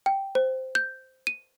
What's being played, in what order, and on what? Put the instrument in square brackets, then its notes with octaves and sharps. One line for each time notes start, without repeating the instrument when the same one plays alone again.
[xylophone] G5
C5
G6
D#7